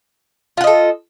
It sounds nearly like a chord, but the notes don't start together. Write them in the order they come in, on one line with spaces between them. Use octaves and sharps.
F4 F#5 D#5 A4